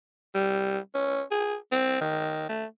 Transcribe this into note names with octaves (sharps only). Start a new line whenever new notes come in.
G3
C#4
G#4
C4
D#3
A3